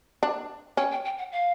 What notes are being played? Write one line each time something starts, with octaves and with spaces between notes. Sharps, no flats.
D4
C#4 G5
G5
G5
F#5
F5